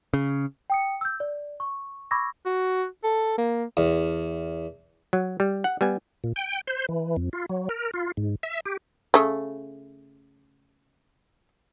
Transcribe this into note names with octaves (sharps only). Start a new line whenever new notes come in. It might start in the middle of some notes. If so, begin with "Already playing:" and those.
C#3
G5 D#6 C#7
E6 G6
D5
C#6
B5 C#6 D6 E6 G#6 A#6
F#4
A4
A#3
E2
F#3
G3
F#5
G3 B3 G#5
A#2
G5
C5
E3
F2
F4
F#3
A#4
F4
G#2
E5
G4
C#3 A3